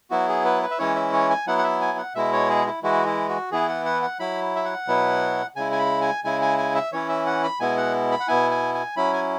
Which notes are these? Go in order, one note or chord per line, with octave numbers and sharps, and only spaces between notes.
F#3 B3 E4 F#4
G#4
B4
B4
E5
E3 G#3 C#4 E4 C#5
E5
C#5
G#5
F#3 B3 E4 F#5
F#5
E5
G#5
F#5
B2 G#3 E4 E5
C#5
G#4
E4
E3 G#3 E4 F#4
E4
F#4
E3 B3 E4 G#4
F#5
F#5
F#5
F#3 E4 B5
E5
F#5
B2 F#3 B3 E4
C#3 G#3 E4 G#5
G#5
B5
G#5
C#3 G#3 E4 G#5
G#5
G#5
E5
E3 C#4 E4 C#5
E5
F#5
B5
B2 G#3 B3 E4 G#5
F#5
B5
F#5
B2 B3 E4 G#5
G#5
G#5
F#3 C#4 E4 B5
G#5